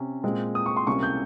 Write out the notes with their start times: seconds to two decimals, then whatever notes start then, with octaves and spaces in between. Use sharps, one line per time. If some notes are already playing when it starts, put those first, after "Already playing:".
Already playing: C3 C#4
0.24 A#2 G#3 C4
0.55 D#6
0.66 C#6
0.77 C6
0.87 C#2 C3 G3 A#3 C#4 C#6
1.03 G6